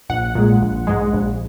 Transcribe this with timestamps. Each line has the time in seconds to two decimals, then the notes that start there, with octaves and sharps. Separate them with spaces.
0.09 A#1 F#5
0.35 A#2 G#3
0.62 A#1
0.87 G#2 G#3
1.13 A#1